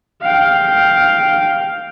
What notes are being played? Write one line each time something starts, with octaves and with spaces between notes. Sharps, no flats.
F5 G5